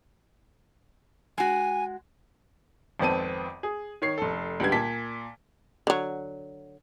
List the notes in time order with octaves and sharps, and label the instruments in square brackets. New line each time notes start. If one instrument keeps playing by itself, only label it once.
[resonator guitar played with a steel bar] G#3 F#4 [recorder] G#5
[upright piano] G#1 F2 B3 C4 A5 D#7
G#4
D#3 C#5 C7
F1 A4
C#2 D3 G3 B3 G#6
A#2 A5 B6
[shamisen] D3 F#3